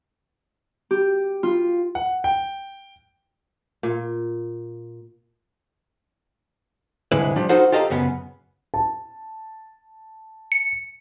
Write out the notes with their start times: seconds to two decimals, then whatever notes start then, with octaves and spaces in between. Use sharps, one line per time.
0.91 G4
1.43 F4
1.95 F#5
2.24 G5
3.83 A#2
7.12 C2 G#2 D3 G#3 E4 B4
7.36 F3 G3 D4
7.49 D#4 F4 F#4 A4 C5 F#5
7.72 F4 G4 A4 D#5 F5 A#5
7.90 F#2 C#3 B3
8.74 A5
10.52 C#7